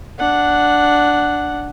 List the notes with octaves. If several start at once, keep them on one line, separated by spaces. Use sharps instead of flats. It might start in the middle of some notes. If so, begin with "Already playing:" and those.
D4 F#5